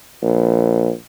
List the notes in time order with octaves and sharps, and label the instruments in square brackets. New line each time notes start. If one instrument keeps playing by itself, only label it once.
[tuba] A#1